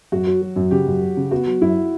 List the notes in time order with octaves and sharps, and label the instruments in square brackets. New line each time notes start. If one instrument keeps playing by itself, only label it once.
[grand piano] F#2 [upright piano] F#4
[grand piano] F#3
F#3
F#2
[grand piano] C#3 [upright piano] G4
[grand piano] F#2
F#3
C#3
[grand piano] B3 [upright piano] F#4
[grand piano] F#3
[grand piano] F#2 [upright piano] E4